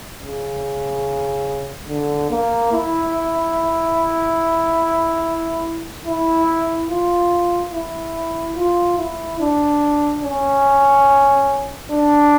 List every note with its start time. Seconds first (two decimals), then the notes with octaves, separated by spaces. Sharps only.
0.21 C#3
1.88 D3
2.30 A#3
2.72 E4
6.05 E4
6.90 F4
7.73 E4
8.56 F4
8.98 E4
9.40 D4
10.24 C#4
11.91 D4